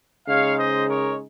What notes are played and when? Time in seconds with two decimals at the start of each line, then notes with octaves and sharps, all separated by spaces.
0.27 C#3 G#3 D#4 C#5 F5
0.57 C5 D#5
0.88 A#4 C#5